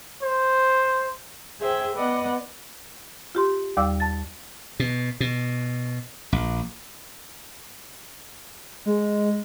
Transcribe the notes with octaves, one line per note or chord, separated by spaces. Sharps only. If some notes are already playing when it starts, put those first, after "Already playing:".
C5
G#4 C5 E5 G5
B3 B4 D5 D#5 F#5
F4 G4 C6
D#2 G3 D5 F5 D6 E6
A5 A6
B2
B2
A#1
G#3